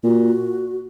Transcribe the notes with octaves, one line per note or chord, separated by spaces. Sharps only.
A#2 F#4